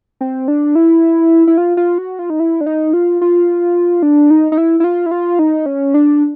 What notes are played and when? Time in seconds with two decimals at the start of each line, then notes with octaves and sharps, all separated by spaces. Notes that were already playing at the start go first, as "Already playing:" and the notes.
0.21 C4
0.48 D4
0.75 E4
1.47 E4
1.58 F4
1.77 F4
1.98 F#4
2.19 F4
2.30 D#4
2.40 E4
2.61 D4
2.66 D#4
2.93 F4
3.21 F4
4.03 D4
4.30 D#4
4.52 D#4
4.57 E4
4.80 E4
4.84 F4
5.06 E4
5.11 F4
5.39 D#4
5.66 C#4
5.94 D4